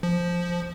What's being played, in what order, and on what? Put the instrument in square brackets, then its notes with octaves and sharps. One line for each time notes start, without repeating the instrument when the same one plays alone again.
[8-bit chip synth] F3